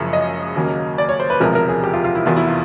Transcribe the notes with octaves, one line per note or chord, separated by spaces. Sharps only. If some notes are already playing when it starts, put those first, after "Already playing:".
Already playing: F#1 F#2 C#3 F3 G#3
D#5
D#2 C#3 F#3 A#3
D5
C#5
C5
B4
E1 D2 C3 F3 G#3 A#4
A#4
G#4
G4
F4
F4
E4
F1 E2 B2 F4
E4
F4